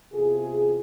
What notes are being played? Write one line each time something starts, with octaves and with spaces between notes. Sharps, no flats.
E2 C3 F4 G#4